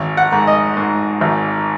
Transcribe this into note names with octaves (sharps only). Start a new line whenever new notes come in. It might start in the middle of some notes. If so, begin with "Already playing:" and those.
Already playing: G#1
F#5
G#2
D#5
G#2
G#1